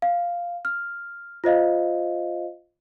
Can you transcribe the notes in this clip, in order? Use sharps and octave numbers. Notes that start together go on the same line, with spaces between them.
F5
F6
F4 C5 D#5 F5